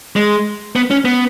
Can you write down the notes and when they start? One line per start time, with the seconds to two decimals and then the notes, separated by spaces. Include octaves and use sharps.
0.16 G#3
0.76 B3
0.91 C#4
1.05 B3